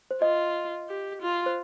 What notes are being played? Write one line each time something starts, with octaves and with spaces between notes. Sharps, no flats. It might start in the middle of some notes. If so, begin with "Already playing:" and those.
C5
F4 D#5
G4
F4
C5